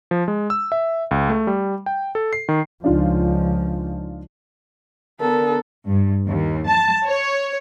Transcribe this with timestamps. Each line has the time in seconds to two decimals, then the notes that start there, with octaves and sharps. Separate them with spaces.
0.11 F3
0.28 G#3
0.50 E6
0.72 E5
1.11 C#2
1.29 A3
1.47 G3
1.86 G5
2.15 A4
2.33 C7
2.49 D#3
2.84 C#2 F3 D4 D#4 F4
5.20 D3 B3 A4 A#4
5.88 G2
6.26 D#2
6.68 A5
7.07 C#5